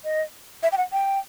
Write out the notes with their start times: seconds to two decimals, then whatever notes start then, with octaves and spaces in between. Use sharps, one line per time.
0.05 D#5
0.63 E5
0.72 G5
0.77 F#5
0.92 G5